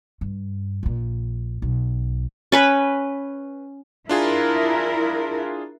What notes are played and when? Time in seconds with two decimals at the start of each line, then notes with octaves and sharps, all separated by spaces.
0.21 G2
0.83 A#1 A#2
1.62 B1
2.52 C#4 B4 B5
4.09 D4 E4 F4 G#4 A#4